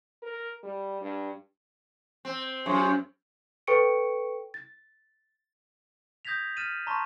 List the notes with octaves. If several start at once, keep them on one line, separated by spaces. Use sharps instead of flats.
A#4
G3
G2
C4
F#2 F4 G#4 C#5
A4 B4 G5 C#6 C#7 D7
A6
D#6 G6 G#6 A#6 B6 F7
F6 A6 B6 D#7 E7 F#7
A5 A#5 C6 C#6